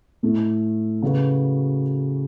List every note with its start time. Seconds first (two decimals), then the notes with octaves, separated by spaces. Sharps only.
0.23 A2 A3 E4 A4
1.02 C#3 F#3 A3 F#4 B4